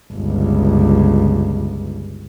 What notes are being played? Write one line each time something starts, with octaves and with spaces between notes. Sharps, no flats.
G1 C#2